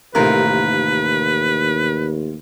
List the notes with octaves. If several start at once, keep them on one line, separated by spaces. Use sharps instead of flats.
A1 D#2 C3 D#4 F4 A#4 B4